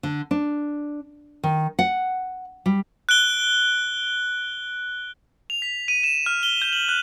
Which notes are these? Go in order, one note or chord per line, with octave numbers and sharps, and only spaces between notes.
D3
D4
D#3
F#5
G3
F#6 D7 G7
F7
B6
D#7
E7
F6
G7
G6
F#7
F#6